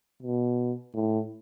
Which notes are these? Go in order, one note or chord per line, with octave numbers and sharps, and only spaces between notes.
B2
A2